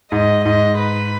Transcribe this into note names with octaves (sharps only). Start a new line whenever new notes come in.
G#2 D#5
G#2 D#5
B4